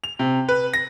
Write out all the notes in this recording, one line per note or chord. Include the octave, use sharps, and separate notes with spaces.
F7
C3
B4
A#6